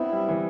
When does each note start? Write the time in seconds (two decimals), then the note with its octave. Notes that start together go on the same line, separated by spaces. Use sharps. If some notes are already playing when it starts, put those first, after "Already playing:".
Already playing: B3 C4 D4 E4
0.13 G3
0.29 E3